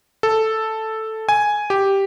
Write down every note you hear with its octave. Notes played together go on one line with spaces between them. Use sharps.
A4
G#5
G4